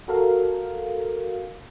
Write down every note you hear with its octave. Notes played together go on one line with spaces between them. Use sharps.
F#4 A4 A#4 F5